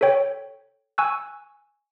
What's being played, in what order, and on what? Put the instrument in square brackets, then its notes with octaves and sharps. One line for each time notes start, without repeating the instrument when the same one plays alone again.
[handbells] A4 C5 C#5 G5
G#5 C#6 E6 F#6